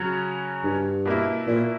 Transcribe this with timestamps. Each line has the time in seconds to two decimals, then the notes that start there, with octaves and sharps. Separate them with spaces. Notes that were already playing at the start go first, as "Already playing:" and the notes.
Already playing: C#3 F#3 C#4 F#4
0.64 G2
1.05 B2 A#3 E4
1.47 A#2